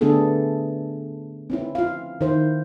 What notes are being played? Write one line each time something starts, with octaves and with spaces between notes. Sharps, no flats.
D3 A3 B3 D4 G#4 A4
C4 C#4 E4
F4 F5
D#3 E4 C5